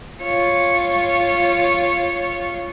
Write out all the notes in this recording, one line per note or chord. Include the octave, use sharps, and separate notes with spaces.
F4 C#5